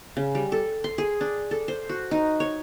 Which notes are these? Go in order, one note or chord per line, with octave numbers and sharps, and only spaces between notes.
C#3
G3
A4
C6
G#4
D4
A4
C5
F#4
D#4
C#5